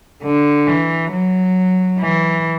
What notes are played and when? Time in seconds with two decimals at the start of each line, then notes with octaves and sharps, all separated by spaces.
0.23 D3
0.66 E3
1.12 F#3
1.99 E3